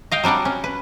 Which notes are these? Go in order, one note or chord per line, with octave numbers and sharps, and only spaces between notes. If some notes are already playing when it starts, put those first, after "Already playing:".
D#5 F5 G5
F#3 G3 D4 D5 F#5
C#4
B4